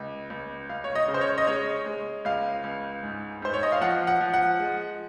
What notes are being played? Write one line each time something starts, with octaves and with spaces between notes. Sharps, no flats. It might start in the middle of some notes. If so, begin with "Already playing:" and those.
Already playing: C#2
C#2
C#2 F5
C#5
D#5
C#3
C5
C#5
D#5
G#3 C#5
G#3
C#2 F5
C#2
G#2
G#2 C5
C#5
D#5
F5
F3 F#5
F#5
F3
F#5
G#3